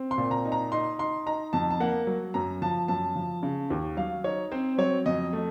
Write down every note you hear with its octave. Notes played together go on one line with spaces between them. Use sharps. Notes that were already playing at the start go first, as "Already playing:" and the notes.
Already playing: C4
C6
A#2
A#5
D#4
A#5
D#4 C6
D#4 C6
D#4 A#5
F2 A5
A5
A#3 F#5
F#3
F#2 A#5
F3 A5
F#2 A5
F3
C#3
D#2
F#3 F5
D#4 C#5
C4 C5
F#3 C#5
F2 D#5
A3